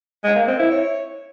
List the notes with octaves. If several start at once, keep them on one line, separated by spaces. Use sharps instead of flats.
G#3
A#3
C4
E4
C#5